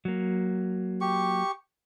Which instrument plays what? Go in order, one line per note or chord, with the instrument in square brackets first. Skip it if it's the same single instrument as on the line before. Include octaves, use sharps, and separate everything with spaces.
[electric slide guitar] F#3 A#3
[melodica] G4 C#6